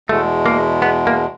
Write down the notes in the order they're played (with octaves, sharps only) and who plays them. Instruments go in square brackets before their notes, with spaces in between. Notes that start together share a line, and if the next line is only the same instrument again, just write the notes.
[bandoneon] E2 B2 G#3 [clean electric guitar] A3
[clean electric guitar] A#3
B3
A#3